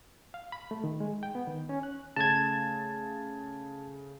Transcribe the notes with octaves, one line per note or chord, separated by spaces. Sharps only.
F5
B5
A3
D#3
G#3
G5
B3
D#3
C#4
F#6
C#3 A3 A5 G#6 A6